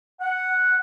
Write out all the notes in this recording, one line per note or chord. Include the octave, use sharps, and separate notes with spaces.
F#5